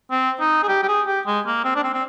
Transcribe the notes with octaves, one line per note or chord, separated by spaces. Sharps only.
C4
D#4
G#4
G4
G4
G#4
G4
G#3
A#3
C4
D4
C4
C4